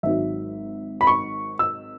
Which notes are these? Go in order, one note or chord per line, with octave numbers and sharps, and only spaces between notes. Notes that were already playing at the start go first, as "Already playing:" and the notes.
G#1 G#2 F#3 E5
B5
C#6
E6